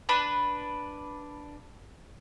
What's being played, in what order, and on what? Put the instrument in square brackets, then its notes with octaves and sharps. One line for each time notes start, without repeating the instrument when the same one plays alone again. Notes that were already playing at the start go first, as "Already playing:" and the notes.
[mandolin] D4 B4 A5